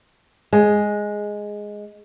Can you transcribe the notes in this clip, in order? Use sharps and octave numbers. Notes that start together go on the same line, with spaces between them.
G#3